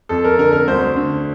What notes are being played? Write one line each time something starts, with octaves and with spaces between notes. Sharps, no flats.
F2 A4
A#4
D3 A#4
A#4
D2 C5
D3